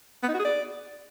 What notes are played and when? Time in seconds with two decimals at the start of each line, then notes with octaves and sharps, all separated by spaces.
0.23 B3
0.28 D#4
0.34 F#4
0.39 G#4
0.45 D5